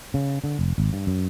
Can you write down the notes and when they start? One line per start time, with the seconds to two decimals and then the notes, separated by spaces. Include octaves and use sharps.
0.14 C#3
0.44 D3
0.59 F1
0.78 G#1
0.93 G2
1.07 F#2